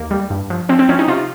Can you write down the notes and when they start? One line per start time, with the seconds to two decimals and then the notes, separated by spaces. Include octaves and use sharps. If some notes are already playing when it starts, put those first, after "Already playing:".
Already playing: D#2 A#3
0.11 G3
0.30 G2
0.50 F3
0.69 F3 C4
0.79 C4
0.89 F3 C#4
0.99 D#4
1.08 C3 F4